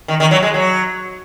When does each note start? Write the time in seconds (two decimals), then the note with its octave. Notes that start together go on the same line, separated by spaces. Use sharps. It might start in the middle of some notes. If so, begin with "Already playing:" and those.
0.08 D#3
0.20 D#3
0.31 F#3
0.42 G#3
0.54 F#3